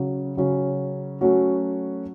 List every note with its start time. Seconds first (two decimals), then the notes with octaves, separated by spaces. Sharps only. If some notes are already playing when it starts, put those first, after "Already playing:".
Already playing: C#3 F#3 C#4
0.37 C#3 F#3 C#4
1.21 F#3 A3 C#4 F#4